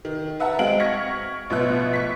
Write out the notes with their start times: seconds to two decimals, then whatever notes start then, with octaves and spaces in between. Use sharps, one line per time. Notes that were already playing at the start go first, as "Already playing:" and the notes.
0.05 D#3
0.40 B4 E5 F#5 A5 A#5
0.59 G#3 C4 F#4 F5 D7 F#7
0.80 C#6 F6 G#6 A#6 B6 C#7
1.50 A1 B2 F3 B3 E5 F#6
1.93 C#6 B6